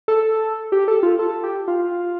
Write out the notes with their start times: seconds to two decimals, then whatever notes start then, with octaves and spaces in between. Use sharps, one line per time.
0.08 A4
0.72 G4
0.88 A4
1.03 F4
1.19 A4
1.43 G4
1.68 F4